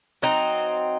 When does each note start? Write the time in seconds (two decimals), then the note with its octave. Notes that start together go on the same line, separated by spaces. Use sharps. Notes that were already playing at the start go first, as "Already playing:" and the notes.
0.22 F#3 C4 D#4